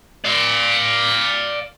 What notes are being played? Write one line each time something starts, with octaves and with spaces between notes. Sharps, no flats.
D5 F5